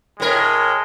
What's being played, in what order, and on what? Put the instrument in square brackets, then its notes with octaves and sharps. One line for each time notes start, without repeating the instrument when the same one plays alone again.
[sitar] A2 A#4 [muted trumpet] G#3